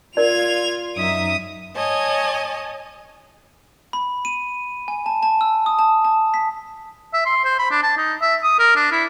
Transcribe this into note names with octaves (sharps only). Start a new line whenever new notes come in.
F4 A#4 D5 G#6 F7
F#2 D#4 E5 D#6
C#5 D#5 G#5 A5
B5
D#7
G#5
A5
A5
E6
D#6
A5
A5
B6
E5
C6
C5
B5
D4
A5
D#4
E5
D#6
A#4
D4
E4